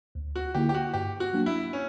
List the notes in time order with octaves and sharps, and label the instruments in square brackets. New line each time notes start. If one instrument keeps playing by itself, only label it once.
[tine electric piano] D2
[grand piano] F#4
[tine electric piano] D3 A#3 E4 [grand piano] G4
[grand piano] G4
F#4
[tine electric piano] G2 [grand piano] G4
[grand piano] F#4
[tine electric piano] F#3 A#3 D4
[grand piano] E4
C#4